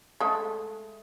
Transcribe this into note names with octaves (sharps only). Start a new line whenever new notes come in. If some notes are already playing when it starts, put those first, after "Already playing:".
G#3 A3